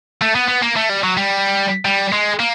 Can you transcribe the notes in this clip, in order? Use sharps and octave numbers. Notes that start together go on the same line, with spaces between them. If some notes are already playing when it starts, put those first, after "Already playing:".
A3
B3
B3
A#3
A3
G3
F#3
G3
G3
G#3
A#3